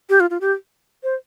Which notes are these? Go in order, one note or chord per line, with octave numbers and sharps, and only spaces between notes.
G4
F4
F4
G4
C5